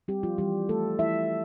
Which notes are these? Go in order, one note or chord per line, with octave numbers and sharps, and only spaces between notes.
G3 C4 G4
F3 F4
E3 G3 G4
G3 A3 A4
E3 E4 E5